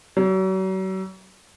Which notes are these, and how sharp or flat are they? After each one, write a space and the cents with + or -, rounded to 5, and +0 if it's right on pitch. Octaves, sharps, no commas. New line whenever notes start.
F#3 +40